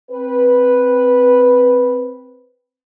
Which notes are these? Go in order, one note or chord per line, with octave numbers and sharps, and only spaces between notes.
C4 B4